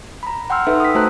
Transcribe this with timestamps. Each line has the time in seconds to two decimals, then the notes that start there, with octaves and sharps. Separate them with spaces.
0.23 A#5 B5
0.50 F#5 G5 C6 E6 F6
0.67 D#4 A4 B4 E5
0.80 D#6 B6
0.95 A3 F#4 C5 A5 A#5 F#6